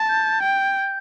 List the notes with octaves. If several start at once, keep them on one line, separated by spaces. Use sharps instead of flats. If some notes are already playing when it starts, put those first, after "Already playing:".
Already playing: A5
G6
G5